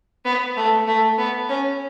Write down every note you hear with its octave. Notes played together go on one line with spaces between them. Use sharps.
B3
A3
A3
B3
C#4